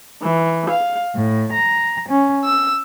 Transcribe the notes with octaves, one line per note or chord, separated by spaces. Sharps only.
E3
F5
A2
A#5
C#4
E6